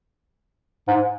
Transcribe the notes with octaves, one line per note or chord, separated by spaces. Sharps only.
G#2